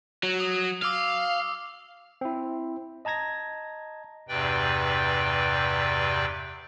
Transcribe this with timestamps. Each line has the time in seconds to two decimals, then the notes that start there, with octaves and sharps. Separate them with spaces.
0.23 F#3
0.40 D#6
0.82 F5 D6 E6 C7
2.21 C4 E4
3.05 D#5 A5 A#5 G#6 A#6
4.29 E2 G2 C3 B4 D5 G5